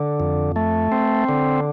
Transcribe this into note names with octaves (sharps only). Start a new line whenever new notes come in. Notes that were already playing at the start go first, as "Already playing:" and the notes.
Already playing: D3
F2
A3
C4
D3